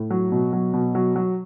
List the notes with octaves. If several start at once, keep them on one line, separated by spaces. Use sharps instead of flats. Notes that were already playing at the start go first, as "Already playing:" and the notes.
Already playing: A2
F#3
B2
F#3
B2
F#3
F#3